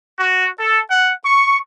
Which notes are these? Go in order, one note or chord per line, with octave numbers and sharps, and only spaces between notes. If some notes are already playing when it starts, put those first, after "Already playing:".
F#4
A4
F#5
C#6